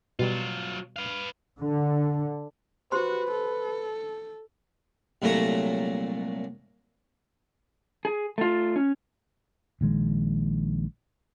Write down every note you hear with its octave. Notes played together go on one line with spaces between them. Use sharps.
B2 F#3 G3 F4
B4 F5
D3
F#4 G4 B4 C5 C6
A4
C2 A#2 F#3 A3 A#5 C#6
G#4
A3 F4
C#4
A#1 D#3 G#3